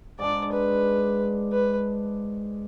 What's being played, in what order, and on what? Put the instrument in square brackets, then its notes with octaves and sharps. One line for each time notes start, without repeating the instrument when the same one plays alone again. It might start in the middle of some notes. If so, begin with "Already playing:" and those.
[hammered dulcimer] G#2 G#3 D4 [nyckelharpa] D5
[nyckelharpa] B4
B4